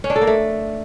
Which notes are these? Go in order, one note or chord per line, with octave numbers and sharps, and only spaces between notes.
C#4
D4
A4
A#3
A3